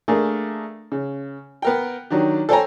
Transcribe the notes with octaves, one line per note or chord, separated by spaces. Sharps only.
A3 A#3 D4 G#4 A#4
C#3
B3 A#4 G5
D#3 F#3 D4 G4
A4 C5 C#5 G5 G#5 A#5